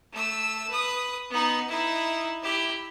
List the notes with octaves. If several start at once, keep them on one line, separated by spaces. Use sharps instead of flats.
A3 E6
B4 D#6
B3 D#4
D#4 E4
E4 G4